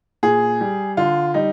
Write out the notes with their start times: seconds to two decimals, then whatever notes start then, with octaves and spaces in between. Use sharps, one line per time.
0.23 A#2 G#4
0.61 G3
0.97 D3 F4
1.34 G3 D#4